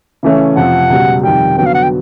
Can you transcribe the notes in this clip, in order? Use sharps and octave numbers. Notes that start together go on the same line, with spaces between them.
C#3 E3 A3 C#4
F2 C3 F3 F#5
C#2 B2 G3
F2 C3 D#3 G3 G5
D3 F#3 B3 G5
F5
F#5
G5